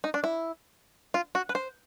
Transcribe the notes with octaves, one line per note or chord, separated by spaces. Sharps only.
D#4
D4
E4
F4
F#4
B4
C5